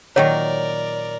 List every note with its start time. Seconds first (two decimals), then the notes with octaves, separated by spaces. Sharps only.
0.16 A#2 D#3 F#3 A#4 C#5 D5